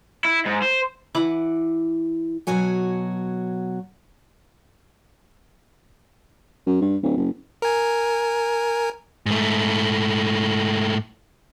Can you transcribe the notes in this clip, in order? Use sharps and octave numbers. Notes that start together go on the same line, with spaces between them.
E4
G#2
C5
E3 E4 F#5 D6
B2 F#3 F#4 C#5 G#5
F#2
G2
D1
F#1
A#4 G#5
G#2 A3